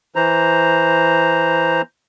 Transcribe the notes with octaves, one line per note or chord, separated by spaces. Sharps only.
E3 C5 A#5